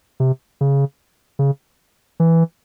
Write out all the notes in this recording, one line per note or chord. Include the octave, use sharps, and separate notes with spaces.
C3
C#3
C#3
E3